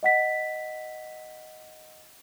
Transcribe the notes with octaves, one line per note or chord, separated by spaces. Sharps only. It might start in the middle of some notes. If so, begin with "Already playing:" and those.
D#5 F#5 B6